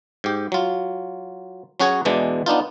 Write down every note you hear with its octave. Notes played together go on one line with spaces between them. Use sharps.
G#2 G4
F#3 F4
F#3 C#4 F#4 G#4 C#5
E2 B2 E3 G#3 D4
B3 D4 D#4 F4